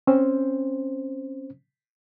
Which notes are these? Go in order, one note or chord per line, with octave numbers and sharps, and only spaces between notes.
C4 C#4 C5